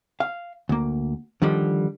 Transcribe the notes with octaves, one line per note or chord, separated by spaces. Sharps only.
F5
D2 A#3
D3 D#3 F3 G3